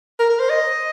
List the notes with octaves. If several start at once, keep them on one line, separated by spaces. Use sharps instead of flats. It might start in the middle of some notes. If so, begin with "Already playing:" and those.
A#4
A#4
C5
D#5